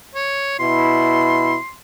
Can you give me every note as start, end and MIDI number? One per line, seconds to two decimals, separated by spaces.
0.15 0.57 73
0.60 1.57 47
0.60 1.57 64
0.60 1.74 84